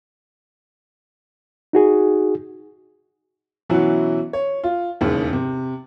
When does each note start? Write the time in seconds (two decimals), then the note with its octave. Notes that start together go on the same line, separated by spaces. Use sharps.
1.73 D#4 F#4 G#4
3.70 B2 E3 F#3 C#4 E4 F#4
4.33 C#5
4.64 F4
5.01 E1 D#2 C#3
5.33 C3